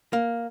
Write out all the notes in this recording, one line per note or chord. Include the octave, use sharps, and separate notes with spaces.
A#3